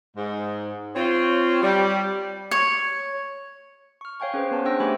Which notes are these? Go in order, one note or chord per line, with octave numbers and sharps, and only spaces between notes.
G#2
C4 F4 C#5
G3
C#5
C#6 F6
C#5 F5 G5 G#5 C#6
C#4 G#4 B4 C5
B3 B4 A5
D4 G#4 C5 G5 E6 A#6
A3 D4 G4 G#5 B5 C#6